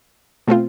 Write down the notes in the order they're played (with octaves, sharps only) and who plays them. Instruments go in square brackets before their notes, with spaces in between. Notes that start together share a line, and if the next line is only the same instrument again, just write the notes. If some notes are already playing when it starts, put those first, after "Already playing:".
[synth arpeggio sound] B2 A3 C4 F4